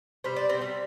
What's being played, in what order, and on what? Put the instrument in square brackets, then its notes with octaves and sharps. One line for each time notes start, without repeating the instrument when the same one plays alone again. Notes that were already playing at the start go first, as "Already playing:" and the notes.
[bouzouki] C3 G3 C5
D5
C4 C5
C3 G3